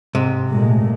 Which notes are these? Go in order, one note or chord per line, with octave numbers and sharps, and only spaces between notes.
G#2 C3
A#2 G#3 A3